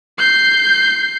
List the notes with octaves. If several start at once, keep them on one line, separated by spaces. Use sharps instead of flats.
G6 C7